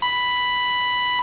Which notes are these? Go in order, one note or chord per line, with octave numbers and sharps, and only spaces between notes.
B5